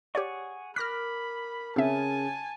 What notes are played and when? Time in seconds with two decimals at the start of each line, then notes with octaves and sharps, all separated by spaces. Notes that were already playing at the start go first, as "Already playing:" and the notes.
0.15 G4 G#4 C#5 D5 F#5 C#6
0.76 A#4 B5 D6 F6 F#6 A#6 B6
1.76 C#3 C4 E5 G#5 A5